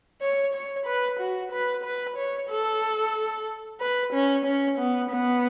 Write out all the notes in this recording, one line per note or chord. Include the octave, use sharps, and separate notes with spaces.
C#5
C#5
B4
F#4
B4
B4
C#5
A4
B4
C#4
C#4
B3
B3